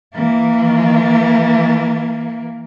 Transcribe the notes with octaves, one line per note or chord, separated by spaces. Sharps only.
E3 A#3